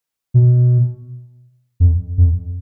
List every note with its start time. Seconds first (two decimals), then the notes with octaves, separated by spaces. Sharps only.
0.34 B2
1.80 F2
2.18 F2